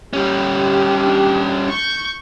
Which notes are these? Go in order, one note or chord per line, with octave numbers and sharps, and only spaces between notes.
G3 C#4 G4
D4
C#6 G6